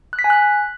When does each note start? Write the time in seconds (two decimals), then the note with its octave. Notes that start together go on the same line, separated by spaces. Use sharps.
0.13 F#6
0.19 B6
0.24 G#5
0.30 F#6